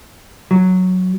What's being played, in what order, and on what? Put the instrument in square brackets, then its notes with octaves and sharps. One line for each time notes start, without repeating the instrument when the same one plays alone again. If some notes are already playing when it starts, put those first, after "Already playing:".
[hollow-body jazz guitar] F#3